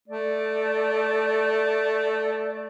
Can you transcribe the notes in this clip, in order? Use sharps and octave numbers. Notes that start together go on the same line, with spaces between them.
A3 D5